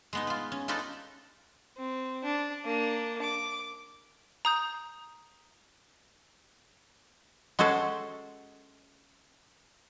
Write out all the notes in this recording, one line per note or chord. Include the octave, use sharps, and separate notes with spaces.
G#3 B3 D#4
F4 B4
C#4
D#4 F4 G4 A4 B4 D5
C4
D4
A#3 D4
D6
A#5 D#6 G6
G#3 C#4 F#4 A4 C5